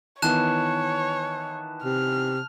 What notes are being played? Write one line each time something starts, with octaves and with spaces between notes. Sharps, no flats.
D#3 E3 B3 C#5 A5 F#6 E7
C3 F6